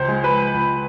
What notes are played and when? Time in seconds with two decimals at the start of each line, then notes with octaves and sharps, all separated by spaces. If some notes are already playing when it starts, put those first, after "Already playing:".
Already playing: C#2 C5
0.08 G#3
0.24 B4
0.54 C#2